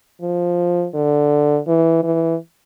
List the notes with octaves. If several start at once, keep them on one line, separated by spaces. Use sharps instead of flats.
F3
D3
E3
E3